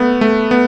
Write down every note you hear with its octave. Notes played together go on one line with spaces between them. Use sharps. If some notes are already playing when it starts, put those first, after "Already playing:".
Already playing: A3 B3
A3
B3